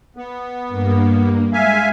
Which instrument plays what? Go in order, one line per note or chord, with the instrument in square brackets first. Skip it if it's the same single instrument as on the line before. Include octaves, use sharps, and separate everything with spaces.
[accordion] B3
[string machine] G2 A#3
[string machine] G#3 [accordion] E5 F5 G#5